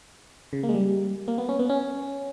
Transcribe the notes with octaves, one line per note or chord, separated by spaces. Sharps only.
C#3
A#3
G#3
G3
A#3
B3
C#4
B3
C#4